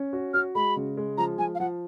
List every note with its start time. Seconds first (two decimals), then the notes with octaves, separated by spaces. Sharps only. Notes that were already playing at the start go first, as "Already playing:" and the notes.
Already playing: C#4
0.13 F#4
0.34 F#4 F6
0.55 G#3 B5
0.76 C#3
0.97 G#3
1.18 F3 A#5
1.38 F3 G#5
1.55 F5
1.60 F3 F#5